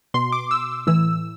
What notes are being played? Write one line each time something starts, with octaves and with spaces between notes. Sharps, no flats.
B2 C6
D6
E6
A2 E3 E6